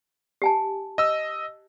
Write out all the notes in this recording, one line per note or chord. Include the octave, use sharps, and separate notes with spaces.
G4 G#5 A5
D#5 E6